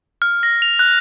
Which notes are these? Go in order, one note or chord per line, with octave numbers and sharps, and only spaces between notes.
F6
A#6
F7
F#6